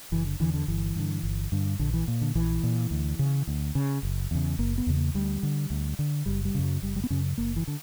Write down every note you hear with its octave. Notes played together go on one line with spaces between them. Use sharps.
F#1 E3
D3
E2 D3 E3
D3
G1 E3
G2 D3
G1
G2 D3
A#1 D3
E3
A#2
D3
A#1 E3
A#2
D2
C#3
D2
C#3
F#1
E2 C#3
F#1 A#3
B3
E2 C#3
A#3
D2 G3
D3
D2
D3
F#1 G3
G3
F#2 C#3
F#3
F#1 G3
G3
B3
F#2 C#3 C#4
F#1 A#3
E3
D3